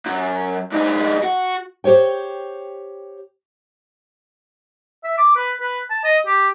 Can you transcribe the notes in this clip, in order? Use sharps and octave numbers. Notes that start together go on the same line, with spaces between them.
F#2
G2 D#4
F#4
G4 C5 C#5 G5
E5
D6
B4
B4
A5
D#5
G4